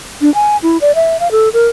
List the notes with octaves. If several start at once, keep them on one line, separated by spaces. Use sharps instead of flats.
D4
G#5
E4
D5
E5
F5
A4
A#4